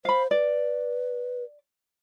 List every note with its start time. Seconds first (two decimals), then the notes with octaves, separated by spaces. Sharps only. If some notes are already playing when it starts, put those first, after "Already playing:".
0.05 C5 F5 B5
0.31 B4 D5